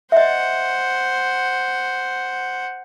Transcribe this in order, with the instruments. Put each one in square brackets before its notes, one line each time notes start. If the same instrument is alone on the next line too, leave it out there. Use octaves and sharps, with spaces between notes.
[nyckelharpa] C5 F#5 [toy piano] D#5 E5